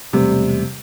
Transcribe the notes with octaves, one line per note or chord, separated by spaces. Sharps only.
E1 C3 G3 A3 B3